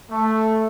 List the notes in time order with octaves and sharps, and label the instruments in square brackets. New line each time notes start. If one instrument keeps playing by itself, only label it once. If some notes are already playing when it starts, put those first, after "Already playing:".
[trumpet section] A3